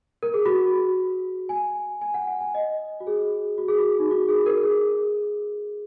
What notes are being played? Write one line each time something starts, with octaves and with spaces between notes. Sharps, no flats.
A#4
G#4
F#4
G#5
G#5
F#5
F#5
G#5
D#5
F#4
G#4
F#4
G#4
F#4
D#4
F#4
G#4
A#4
G#4